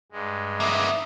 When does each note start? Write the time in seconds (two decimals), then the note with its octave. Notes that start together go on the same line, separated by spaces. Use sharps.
0.12 G2 G#3
0.60 A#3 B3 E5